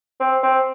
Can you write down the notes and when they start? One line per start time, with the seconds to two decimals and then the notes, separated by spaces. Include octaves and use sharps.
0.20 C4
0.43 C4